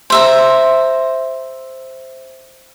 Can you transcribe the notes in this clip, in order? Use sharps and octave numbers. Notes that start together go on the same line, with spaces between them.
C5 E5 A#5